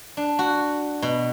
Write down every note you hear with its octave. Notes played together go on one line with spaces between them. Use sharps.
D4
F#4
B2